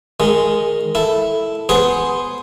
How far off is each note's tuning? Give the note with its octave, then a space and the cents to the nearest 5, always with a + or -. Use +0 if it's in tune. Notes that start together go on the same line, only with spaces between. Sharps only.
D#3 +0 G#3 -5
E4 +0 A4 +0
B3 +0 G#4 +0 C5 +0